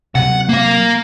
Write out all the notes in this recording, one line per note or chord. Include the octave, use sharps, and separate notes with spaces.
C3 F#3 F#5
A#3 F5